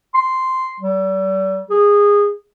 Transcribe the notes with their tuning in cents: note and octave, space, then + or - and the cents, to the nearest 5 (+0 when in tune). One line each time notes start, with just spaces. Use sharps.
C6 -5
G3 -40
G#4 -20